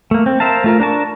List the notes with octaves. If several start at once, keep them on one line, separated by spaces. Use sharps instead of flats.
A3 A#3
C4
A#4 C5 E5 F5 A5
A3 F4 A#4
D4 A#4 A5 C#6